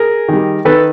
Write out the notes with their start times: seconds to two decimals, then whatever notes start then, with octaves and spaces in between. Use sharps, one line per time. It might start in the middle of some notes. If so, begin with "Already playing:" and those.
Already playing: G#4 A#4
0.29 D#3 G3
0.65 D#3 A4 B4